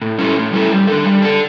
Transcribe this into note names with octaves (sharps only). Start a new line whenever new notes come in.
A2
G3 C#4 E4 A4
A2
G3 C#4 E4 A4
G3
D4 A4
G3
D4 A4